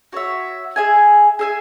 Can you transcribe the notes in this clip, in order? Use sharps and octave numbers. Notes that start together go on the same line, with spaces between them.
F#4 C#5 E5
G#4 E5 G#5
G#4 E5 G#5